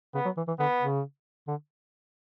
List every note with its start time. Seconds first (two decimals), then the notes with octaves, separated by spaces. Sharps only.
0.15 C#3 B3
0.25 F#3
0.37 E3
0.48 E3
0.59 D3 B3
0.81 C#3
1.48 D3